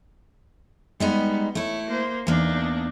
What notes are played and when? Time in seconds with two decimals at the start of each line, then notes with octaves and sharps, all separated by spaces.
1.00 G3 G#3 B3 D#4
1.55 A3 E4 C#5
1.87 A#3 C5
2.27 E2 A#3 D4 D#4